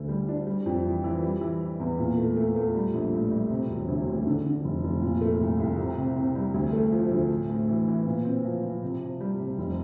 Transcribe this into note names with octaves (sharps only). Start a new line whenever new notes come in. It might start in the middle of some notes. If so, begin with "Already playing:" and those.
Already playing: D2 D3
G3
D4
G3
F2
E3
E3
G3
E3
E3
E2
A#2
A3
A3
A3
G3
A#1
A2
G3
C3
E1
D2
D2
D3
D3
F1
F1
A#2
A3
C2
C2
C3
C3
C3
G3
D2
A3
F3
D2
A2
A2
E3
E3
A#2
C4
F3
F3
C3
C3
G3
C3
F1